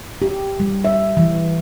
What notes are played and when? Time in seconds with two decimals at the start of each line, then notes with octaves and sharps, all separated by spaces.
0.22 G4
0.60 G3
0.85 E5
1.17 E3